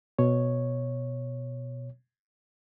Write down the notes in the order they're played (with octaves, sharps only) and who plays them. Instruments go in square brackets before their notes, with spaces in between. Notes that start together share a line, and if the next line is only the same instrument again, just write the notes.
[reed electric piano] B2 C#5